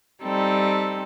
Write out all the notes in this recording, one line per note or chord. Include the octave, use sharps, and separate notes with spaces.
G3 C4 D#4 A4